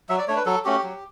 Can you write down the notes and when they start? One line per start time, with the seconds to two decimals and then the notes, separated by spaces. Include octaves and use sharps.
0.09 F#3 E5
0.18 D5
0.28 A3 D4 C#5
0.36 B4
0.46 F#3 A4
0.64 A3 C#4 F#4 G4
0.83 F#3